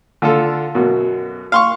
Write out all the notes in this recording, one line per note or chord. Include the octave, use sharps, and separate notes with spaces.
D3 F4 A4
F#2 B2
F5 C6 C#6